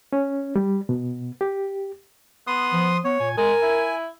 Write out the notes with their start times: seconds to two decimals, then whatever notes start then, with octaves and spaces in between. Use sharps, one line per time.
0.13 C#4
0.56 G3
0.89 B2
1.41 G4
2.47 B3 C6 D#6
2.73 F3
3.04 B3 C#5
3.20 A#2 G#5
3.37 G#3 A#4 G#5
3.62 E4